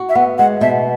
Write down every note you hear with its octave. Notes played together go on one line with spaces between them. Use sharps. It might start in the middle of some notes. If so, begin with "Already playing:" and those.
Already playing: F#4
E5
B3 F#5
G#3 F#5
B2 E5